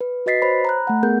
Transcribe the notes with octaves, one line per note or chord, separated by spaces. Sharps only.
B4
F#4 B4 D#5 A6 B6 C7
C5 C#5 B5
A#5 B5 F#6
A3 F#5
B3 G#4 A#4 G6